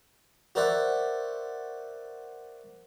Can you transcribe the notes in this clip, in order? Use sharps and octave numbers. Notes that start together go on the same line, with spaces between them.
F#4 A#4 C5 D5 E5 F#5